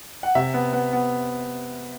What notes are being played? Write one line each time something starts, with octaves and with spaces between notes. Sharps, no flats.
F#5
C3 E5
B3
B3
B3